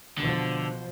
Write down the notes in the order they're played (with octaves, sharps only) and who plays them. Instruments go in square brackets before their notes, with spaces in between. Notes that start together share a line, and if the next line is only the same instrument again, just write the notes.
[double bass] B2 F3 [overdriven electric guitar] D3